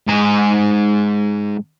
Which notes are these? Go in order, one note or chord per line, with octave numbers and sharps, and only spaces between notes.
G#2 A#5